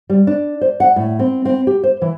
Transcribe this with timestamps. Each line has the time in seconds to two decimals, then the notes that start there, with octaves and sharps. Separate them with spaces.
0.10 G3
0.27 D4
0.61 C5
0.80 F#5
0.96 A2
1.19 C4
1.45 C4
1.67 G4
1.83 C5
2.02 E3